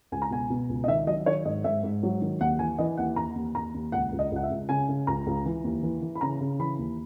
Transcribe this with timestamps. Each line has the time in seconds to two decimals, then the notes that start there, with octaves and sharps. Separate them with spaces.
0.12 C#2 G#5
0.22 A#5
0.30 B2 G#5
0.50 B2
0.69 C#2
0.84 D#5
0.88 D#3 E5
1.07 F#3 D#5
1.26 D#3 C#5
1.45 G#2 D#5
1.64 G#2 E5
1.84 G#2
2.03 F#3
2.21 D#3
2.40 D#2 F#5
2.59 E3 G#5
2.78 E3 D#5
2.97 D#2 F#5
3.16 D#2 A#5
3.35 D#2
3.55 D#2 A#5
3.74 D#2
3.92 C#2 F#5
4.12 C#2
4.19 D#5
4.31 C#2
4.36 F#5
4.43 E5
4.51 C#2
4.69 C#3 G#5
4.89 C#3
5.07 C#2 A#5
5.26 C#2
5.46 E3
5.64 D#2
5.83 E3
6.02 E3
6.15 B5
6.21 C#3 A#5
6.41 C#3
6.59 E3 B5
6.79 D#2